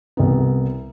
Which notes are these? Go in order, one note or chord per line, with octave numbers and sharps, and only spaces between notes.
C2 B3